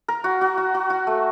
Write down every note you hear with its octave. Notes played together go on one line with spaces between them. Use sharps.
A#4
F#4
F#4
F#4
F#4
F#4
A3